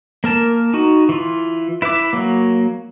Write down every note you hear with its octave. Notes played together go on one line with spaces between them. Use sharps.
A#3 A#4 A5
D#4 F#4
E3 F4
E4 B4 E5 D6
F#3 A#3